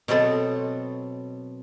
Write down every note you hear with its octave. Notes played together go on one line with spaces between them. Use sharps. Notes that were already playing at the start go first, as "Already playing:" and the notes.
B2 F#3 B3 C4 A4